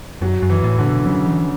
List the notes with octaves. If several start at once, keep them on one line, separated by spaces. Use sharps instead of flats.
F#2 F#3
F#2
E3
A2
D3
B2
C#3 F#3
E3